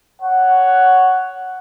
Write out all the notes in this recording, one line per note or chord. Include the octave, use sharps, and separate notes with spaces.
C#5 F#5